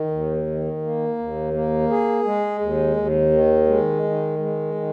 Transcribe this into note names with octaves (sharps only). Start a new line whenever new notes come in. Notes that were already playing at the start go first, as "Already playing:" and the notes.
Already playing: D#3
D#2
D#3
A#3
D#2
A#3
G#4
G#3
D#2
D#2
D#3
G#3
D#3
G#3
D#3